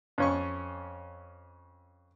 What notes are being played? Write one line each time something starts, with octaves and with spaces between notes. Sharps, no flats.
F2 C#4 C#6